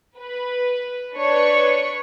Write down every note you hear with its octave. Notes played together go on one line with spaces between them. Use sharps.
B4
D4 B4 C#5 C#6